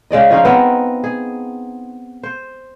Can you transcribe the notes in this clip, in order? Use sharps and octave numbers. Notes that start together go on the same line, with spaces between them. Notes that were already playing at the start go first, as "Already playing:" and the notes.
C#3 G#3 D5 D#5
F3 C#4 D#4 F4
B3 C4 A#4
G#4
C5